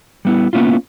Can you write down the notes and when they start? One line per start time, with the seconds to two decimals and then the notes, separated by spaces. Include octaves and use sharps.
0.25 G3 B3 E4
0.53 A#3 B3 C#4 E4 F4